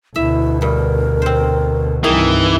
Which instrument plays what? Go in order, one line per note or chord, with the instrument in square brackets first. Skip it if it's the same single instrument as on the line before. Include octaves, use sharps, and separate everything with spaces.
[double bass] D2 B2 [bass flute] E4 [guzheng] E5
[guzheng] G2 [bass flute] A#4
[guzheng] C4 C5
[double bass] C2 G2 [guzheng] D#3 G#4 [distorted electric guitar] E3